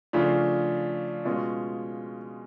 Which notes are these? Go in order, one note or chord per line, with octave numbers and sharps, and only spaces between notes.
C#3 F3 A3 D4 F4
B2 G#3 C#4 F4